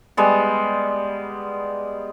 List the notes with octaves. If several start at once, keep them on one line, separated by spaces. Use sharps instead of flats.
G3 G#3 B3